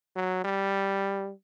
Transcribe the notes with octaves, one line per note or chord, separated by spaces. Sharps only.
F#3
G3